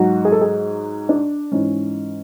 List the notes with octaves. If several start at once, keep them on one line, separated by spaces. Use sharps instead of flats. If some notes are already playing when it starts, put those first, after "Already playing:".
Already playing: G#2 F#3 F#4
G#4
A4
G#4
D4
G#2 E3 C#4